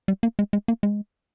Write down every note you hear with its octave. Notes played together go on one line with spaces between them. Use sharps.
G3
A#3
G#3
G#3
A#3
G#3